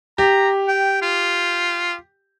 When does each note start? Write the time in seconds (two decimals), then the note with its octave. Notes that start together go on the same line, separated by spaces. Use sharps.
0.18 G4 A#5
0.68 G5
1.02 F4